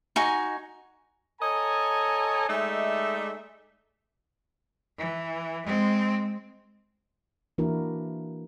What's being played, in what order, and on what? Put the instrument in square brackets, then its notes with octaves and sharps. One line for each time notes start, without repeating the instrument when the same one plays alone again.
[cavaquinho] D#4 F#4 G#5
[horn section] A4 C#5 D#5 G#5 A#5
G#3 A3 D#4 D5 E5
[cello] E3
G#3 C4
[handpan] E3 A#3 D4 E4 F#4 A#4